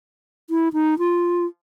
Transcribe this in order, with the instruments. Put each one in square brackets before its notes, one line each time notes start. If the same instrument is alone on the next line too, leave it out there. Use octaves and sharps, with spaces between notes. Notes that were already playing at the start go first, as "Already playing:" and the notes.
[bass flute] E4
D#4
F4